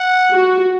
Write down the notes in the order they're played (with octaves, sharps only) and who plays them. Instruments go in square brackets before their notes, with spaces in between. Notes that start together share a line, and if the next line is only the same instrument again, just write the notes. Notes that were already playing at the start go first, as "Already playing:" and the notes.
Already playing: [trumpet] F#5
[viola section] F#4